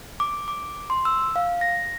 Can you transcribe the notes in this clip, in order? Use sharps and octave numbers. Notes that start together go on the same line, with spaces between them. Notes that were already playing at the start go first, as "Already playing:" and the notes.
D6
D6
C6
E6
F5
A#6